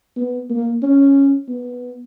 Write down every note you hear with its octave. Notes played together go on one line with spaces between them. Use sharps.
B3
A#3
C#4
B3